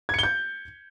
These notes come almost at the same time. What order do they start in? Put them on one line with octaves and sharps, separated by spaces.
G#6 C#7 G7 G6